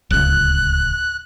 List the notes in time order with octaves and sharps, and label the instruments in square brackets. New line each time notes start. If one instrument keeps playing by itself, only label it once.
[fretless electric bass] D1 C#2 [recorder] F#6